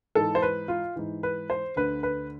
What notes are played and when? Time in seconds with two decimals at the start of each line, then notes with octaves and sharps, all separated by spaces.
0.15 G#2 E3 A4
0.35 C5
0.42 B4
0.68 F4
0.96 G#2 E3
1.23 B4
1.50 C5
1.76 D2 D3 B4
2.03 B4